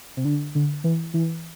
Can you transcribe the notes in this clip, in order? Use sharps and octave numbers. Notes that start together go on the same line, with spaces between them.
C3
D3
D3
E3
E3